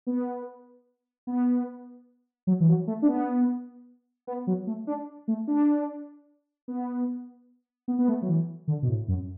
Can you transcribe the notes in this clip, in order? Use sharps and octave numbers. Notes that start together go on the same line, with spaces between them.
B3
B3
F#3
E3
F#3
A3
D4
B3
B3
F#3
A3
D4
A3
D4
B3
B3
B3
A3
F#3
E3
D3
B2
A2
F#2